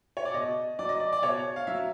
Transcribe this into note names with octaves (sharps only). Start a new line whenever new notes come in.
C#5
D5
B2 D#5
F#3 D5
D#5
D5
D5
B2 C#5
F5
F#3 E5